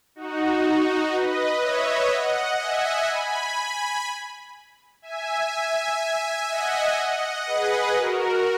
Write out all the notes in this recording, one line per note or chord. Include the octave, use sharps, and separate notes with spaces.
D#4 F#4
D#4 F#4
B4 D#5
C#5 E5
D#5 F#5
E5 G#5
G#5 B5
E5 G#5
E5 G#5
D#5 F#5
G#4 B4
F#4 A#4